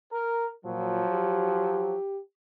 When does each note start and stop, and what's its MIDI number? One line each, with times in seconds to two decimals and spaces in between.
0.12 0.46 70
0.65 1.03 46
0.65 1.94 53
0.65 1.94 54
1.11 2.20 67